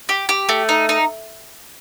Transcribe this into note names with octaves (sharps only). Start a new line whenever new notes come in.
G4
G4
A3
D#4
D#4